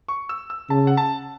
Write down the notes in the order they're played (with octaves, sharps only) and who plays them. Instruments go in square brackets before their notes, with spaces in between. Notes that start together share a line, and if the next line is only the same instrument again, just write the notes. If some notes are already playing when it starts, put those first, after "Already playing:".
[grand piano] C#6
E6
E6
[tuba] C#3 [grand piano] A5
[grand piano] F#5
A5